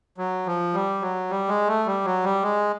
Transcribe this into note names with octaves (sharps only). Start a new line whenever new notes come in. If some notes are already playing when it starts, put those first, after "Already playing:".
F#3
F3
G3
F#3
G3
G#3
A3
G3
F#3
G3
G#3